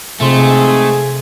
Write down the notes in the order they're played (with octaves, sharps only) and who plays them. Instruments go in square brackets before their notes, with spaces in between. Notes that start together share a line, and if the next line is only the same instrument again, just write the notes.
[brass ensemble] F2 G#2 C4 [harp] C3 C6 [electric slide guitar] A3 [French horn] G#4